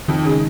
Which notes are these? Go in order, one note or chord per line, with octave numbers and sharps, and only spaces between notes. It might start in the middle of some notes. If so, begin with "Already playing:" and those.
F2 D#3
C#3 G#3